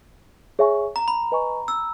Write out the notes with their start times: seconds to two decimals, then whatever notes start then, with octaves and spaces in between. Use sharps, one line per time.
0.59 G#4 C#5 E5 G#5 C#6
0.96 A#5
1.08 B5
1.32 B4 D#5 G#5 C#6
1.68 E6